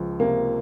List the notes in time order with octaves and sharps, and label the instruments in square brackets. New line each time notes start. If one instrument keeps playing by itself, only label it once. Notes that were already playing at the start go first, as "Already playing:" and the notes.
Already playing: [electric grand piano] C#2 F3
[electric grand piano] C3 [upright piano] A#3